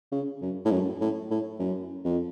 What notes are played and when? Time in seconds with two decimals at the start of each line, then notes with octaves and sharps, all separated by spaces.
0.12 C#3
0.41 F#2
0.65 A2
0.71 F#2
1.01 A2
1.31 A2
1.59 F#2
2.04 F2